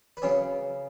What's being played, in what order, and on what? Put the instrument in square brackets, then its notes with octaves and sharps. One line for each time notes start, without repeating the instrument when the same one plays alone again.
[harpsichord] B4
C#3 F#3 B3 C#4 C#5